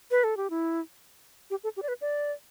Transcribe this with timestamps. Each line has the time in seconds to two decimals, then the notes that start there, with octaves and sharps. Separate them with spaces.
0.11 B4
0.24 A4
0.37 G4
0.50 E4
1.50 G4
1.64 A4
1.77 G4
1.83 D5
1.88 B4
2.01 D5